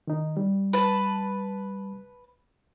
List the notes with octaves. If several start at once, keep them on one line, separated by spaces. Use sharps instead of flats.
D#3 D#4
G3
B4 A5